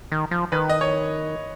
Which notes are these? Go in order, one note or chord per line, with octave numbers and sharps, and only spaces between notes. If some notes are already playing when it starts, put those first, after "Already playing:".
D#3
F3
D#3 B4
D#5
C#5